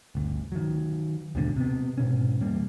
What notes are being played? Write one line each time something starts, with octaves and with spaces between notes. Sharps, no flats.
G1 D2
D#3 F#3
D#2 G#2 B2 D3
C3 B3
G#2 B2 C#4
E1 G3 A#3